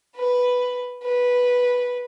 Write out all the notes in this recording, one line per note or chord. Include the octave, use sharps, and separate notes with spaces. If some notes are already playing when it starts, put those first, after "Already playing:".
B4
B4